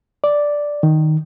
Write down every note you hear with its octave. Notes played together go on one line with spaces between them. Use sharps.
D5
D#3